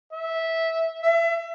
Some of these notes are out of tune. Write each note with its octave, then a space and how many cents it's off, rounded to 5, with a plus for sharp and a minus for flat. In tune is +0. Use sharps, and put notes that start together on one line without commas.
E5 -15
E5 +30